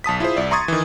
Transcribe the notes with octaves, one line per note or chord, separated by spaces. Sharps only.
B1 A5 D#6 B6
E4 F4 G#4 C5
C2 D5 E5
A#5 C6 C#6 D#6 G#6 A6
D#3 E3